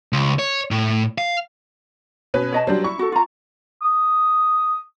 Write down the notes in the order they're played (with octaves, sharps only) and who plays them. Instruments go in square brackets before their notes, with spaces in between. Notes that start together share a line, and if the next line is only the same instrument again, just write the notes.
[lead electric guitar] C#2
C#5
A2
F5
[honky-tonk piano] B2 C#4 B4
[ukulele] C#5 D#5 A5
[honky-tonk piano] F#3 G3 D4 [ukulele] C5
[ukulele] E4 [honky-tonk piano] C#6
[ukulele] F#4 A4
F4 A#5
[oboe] D#6